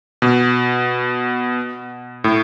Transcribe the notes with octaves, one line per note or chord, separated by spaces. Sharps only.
B2
A2